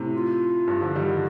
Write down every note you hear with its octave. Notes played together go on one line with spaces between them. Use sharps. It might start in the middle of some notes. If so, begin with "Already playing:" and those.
Already playing: A2 C3
F4
G2
D3 F3
D#3 G3
D3 F3